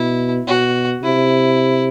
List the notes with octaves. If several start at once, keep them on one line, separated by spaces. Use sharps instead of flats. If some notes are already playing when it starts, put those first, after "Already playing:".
Already playing: B2 E4
B2 F#4
C3 E4